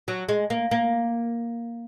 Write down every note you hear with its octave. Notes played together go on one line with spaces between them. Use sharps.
F#3
G#3
A#3
A#3